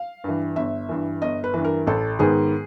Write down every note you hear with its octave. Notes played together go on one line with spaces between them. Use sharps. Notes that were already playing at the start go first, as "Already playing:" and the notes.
Already playing: F5
G2 E3
G1 E5
G2 E3
G1 D#5
B4
G2 E3
A#4
A1 A4
G#2 D#3 G#3 B3 G#4